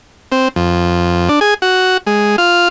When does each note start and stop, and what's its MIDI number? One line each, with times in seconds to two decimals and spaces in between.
0.32 0.48 60
0.56 1.29 41
1.29 1.40 62
1.41 1.54 68
1.62 1.97 66
2.07 2.36 56
2.38 2.68 65